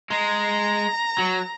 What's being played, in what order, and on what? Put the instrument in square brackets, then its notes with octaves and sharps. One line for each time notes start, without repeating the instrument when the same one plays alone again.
[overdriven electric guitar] G#3 [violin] A#5
[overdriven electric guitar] F#3